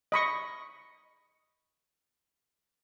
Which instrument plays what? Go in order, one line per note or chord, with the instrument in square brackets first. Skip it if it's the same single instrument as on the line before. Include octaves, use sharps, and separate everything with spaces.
[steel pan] D#5 B5 C#6